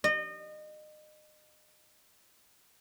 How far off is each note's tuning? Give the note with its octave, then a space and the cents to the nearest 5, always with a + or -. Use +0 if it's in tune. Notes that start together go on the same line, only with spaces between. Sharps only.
D#5 -30